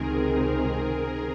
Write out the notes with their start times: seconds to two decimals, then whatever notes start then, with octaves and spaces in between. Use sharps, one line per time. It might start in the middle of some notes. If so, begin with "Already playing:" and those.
Already playing: C#2 C3 D#3 G#3 C4 G#4 A#4
0.44 G#4 A#4